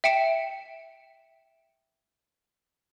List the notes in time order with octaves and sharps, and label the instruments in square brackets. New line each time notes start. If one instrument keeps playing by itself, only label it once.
[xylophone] E5 G5 C#7 E7